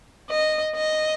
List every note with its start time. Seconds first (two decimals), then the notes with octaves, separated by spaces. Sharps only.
0.30 D#5
0.75 D#5